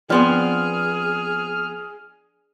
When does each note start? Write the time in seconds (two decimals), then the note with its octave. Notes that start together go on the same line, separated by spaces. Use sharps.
0.10 F3 B3 C4 D4 G#4 D5 C6 F6